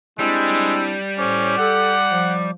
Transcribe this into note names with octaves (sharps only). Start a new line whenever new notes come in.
G3 G#3 C4 D4 E4 E6
A2 C#4 C5 D6
A4 F#5
F3